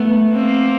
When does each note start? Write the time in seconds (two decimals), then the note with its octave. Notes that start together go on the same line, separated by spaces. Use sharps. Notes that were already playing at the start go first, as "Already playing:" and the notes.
Already playing: A3 B3
0.33 A#3 C4